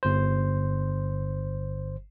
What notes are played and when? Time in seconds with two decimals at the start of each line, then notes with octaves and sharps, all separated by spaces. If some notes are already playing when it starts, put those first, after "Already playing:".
0.03 G1 C5